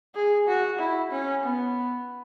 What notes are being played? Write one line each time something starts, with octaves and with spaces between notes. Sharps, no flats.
G#4
F#4
E4
C#4
B3